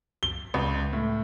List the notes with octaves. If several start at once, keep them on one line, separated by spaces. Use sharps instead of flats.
G7
C#2
A2